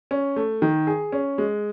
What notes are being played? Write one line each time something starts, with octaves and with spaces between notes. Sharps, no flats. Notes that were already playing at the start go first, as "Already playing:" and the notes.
C#4
A3
D#3
G#4
C#4
G#3